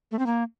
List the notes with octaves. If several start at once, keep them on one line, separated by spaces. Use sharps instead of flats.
A3
C4
A#3